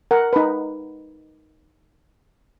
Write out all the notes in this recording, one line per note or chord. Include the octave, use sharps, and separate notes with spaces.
A#4 F#5
D#4 B4